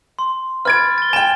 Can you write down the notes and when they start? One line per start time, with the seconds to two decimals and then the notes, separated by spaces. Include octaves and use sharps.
0.19 C6
0.65 B4 F6 G#6 A6 D7
0.98 A6 G7
1.13 G5 G#5 E7